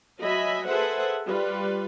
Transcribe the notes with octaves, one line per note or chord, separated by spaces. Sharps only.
F#3 D#5 E5 G#5 B5
G#4 A4 B4 C5 E5 F#5
G3 F4 B4